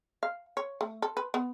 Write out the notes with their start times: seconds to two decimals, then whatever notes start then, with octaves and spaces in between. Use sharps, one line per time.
0.23 F5
0.57 C#5
0.81 A3
1.02 A4
1.17 B4
1.34 B3